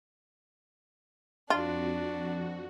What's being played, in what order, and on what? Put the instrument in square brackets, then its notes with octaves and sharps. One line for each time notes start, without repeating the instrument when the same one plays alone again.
[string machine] F2 F#4 [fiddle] D4 [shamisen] F4